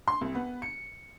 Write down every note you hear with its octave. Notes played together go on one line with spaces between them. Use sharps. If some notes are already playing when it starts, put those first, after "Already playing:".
C6
C2
B3
C#7